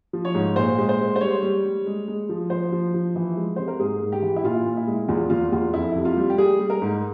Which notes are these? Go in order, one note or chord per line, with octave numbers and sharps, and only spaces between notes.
F3
C#5
G#2
A#2 C5
G#3
C5
G#3
C5
G3 C#5
G3
G3
G#3
G#3
F3
F3 C5
F3
F3
E3
G#3
C3 C5
A#4
G#2 G#4
G#2
G4
E3
E4
A#2 F4
A#2
E4
G#3
E2 F4
E2 F4
E2 F4
F2 E4
C3
F4
G3
G4
G3 G#4
G3
A#4
G#2